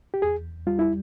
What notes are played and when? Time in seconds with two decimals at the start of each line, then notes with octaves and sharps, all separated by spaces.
0.14 G4
0.22 E2 G#4
0.67 G3 F4
0.79 E4